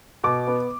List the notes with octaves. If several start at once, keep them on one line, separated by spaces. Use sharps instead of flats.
B2 D6
B3